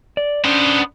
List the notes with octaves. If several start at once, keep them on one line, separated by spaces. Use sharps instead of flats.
D5
B3 C#4 D4 C5